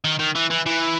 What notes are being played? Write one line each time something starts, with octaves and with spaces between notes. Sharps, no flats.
D#3
D#3
E3
E3
E3